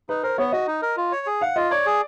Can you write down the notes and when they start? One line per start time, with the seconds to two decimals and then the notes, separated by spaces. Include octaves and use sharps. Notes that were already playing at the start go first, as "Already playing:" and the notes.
0.09 D#4 B4
0.23 A#4 C5
0.38 B3 C#5
0.52 F#4 D#5
0.67 D#4
0.82 A#4
0.97 F4
1.12 C#5
1.27 G#4
1.41 F5 F#5
1.56 F4 D#5
1.71 C#5 D5
1.86 G#4